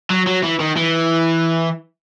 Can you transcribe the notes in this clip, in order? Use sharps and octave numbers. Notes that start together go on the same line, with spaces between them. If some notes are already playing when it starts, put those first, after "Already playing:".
F#3
F#3
E3
D#3
E3